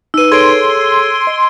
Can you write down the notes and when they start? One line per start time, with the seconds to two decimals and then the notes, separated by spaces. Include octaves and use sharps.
0.14 D#4 B4 E6 D#7
0.32 G#4 A4 C#5 C6 G#6 D7
1.27 D#5